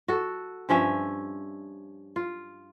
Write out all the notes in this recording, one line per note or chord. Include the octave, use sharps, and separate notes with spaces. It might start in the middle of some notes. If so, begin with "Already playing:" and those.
F#4 A4
G2 F3 C#4 E5
F4